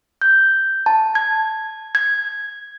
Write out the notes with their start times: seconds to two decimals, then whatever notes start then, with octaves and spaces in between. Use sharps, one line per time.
0.22 G6
0.86 A5
1.15 G#6
1.95 G#6